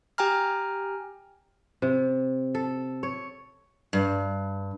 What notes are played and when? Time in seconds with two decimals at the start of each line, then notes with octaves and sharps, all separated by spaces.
0.18 G4 G5 G#5 A#5 F6
1.82 C3
2.55 A4
3.03 C#5
3.93 G2